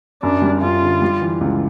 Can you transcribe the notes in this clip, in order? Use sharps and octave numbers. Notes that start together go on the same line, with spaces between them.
F#2 D4
G3
F#2 F4
D3
G3
E3
C#2